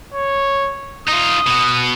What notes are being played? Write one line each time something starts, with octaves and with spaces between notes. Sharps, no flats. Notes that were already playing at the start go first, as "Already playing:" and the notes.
C#5
D#4 F4 D#6
B2 F#4